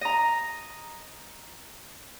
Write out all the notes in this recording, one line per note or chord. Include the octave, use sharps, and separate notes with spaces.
D#5 A#5